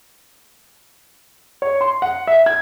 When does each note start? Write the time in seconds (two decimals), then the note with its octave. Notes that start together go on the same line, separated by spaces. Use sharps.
1.62 C#5
1.81 C6
2.02 F#5
2.27 E5
2.46 G#6